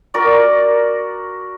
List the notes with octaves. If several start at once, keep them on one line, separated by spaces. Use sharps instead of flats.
F#4 A#4 D5